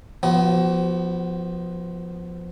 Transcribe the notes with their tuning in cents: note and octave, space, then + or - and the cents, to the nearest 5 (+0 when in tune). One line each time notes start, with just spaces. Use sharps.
F3 +0 B3 +0 F#4 +35